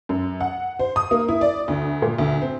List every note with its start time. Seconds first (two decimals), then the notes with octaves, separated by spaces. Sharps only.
0.09 F#2
0.41 F#5
0.79 C5
0.96 D#6
1.11 A#3
1.28 E4
1.41 D5
1.68 D2
2.02 A#2
2.19 D2
2.41 C4